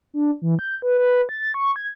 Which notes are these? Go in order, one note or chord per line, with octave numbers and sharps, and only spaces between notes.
D4
E3
G6
B4
B4
A6
C#6
G#6